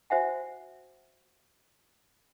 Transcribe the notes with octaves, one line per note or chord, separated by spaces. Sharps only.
F#4 C5 E5 F#5 G#5